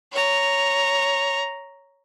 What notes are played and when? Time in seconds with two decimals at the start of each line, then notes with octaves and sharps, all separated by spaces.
0.12 C#5 A#5